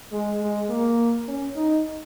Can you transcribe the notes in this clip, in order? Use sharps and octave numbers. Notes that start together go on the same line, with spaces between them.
G#3
G#3
A#3
C#4
D#4